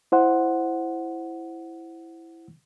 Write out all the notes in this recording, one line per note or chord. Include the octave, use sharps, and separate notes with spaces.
E4 C5 F#5